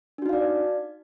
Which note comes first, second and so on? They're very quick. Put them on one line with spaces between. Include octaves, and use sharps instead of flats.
D4 F#4 D#4 F5 D5